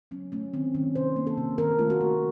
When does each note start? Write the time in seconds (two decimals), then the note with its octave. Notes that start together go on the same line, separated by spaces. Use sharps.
0.11 F#3 C#4
0.32 A3 C#4
0.54 D#3 C4
0.75 D#3 C#4
0.95 C3 C5
1.16 A#3
1.27 A4
1.38 C3
1.58 D#3 A#4
1.79 A3 F4
1.90 F#4
2.01 A3